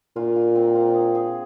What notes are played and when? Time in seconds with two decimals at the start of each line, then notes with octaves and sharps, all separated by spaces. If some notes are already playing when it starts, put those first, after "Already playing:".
0.16 A#2 F4
0.36 F4
0.55 C4
0.75 F4
0.94 G#4
1.15 G#4